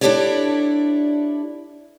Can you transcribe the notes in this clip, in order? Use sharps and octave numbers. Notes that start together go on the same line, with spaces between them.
D4 E4 G4 A4 C#5 D5